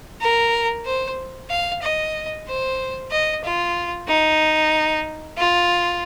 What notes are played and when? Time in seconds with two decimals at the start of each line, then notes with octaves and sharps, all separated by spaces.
0.21 A#4
0.86 C5
1.50 F5
1.82 D#5
2.47 C5
3.11 D#5
3.44 F4
4.08 D#4
5.37 F4